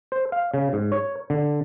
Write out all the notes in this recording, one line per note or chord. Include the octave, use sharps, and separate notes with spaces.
C5
F5
C#3
G#2
C#5
D3